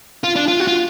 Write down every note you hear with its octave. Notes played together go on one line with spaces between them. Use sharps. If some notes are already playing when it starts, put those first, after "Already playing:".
F4
D4
F4
F#4
F4